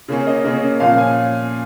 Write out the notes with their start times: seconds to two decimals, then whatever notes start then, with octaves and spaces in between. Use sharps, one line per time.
0.08 C#3 A#3 C#4
0.27 D#5
0.44 C#3 A#3 C#4
0.80 A#2 F3 C#4 F5
0.98 G#5